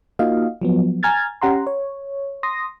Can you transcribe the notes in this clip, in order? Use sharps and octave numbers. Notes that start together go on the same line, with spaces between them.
A#3 D#4 F4 F#4 D#5 F5
F3 F#3 B3
G#5 A#5 F6 G#6 A6
C#4 G4 F#5 A#5 C6
C#5
C6 D#6 A#6